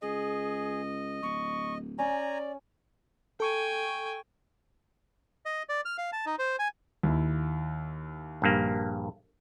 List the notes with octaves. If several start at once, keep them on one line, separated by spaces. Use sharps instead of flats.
C#2 G#4 D#5
D1 C#6
C#4 D5 G#5 A#5
A4 G5 G#5 C#6
D#5
D5
F6
F5
A5
D#4
C5
G#5
D#2 E4
A#1 G2 A#3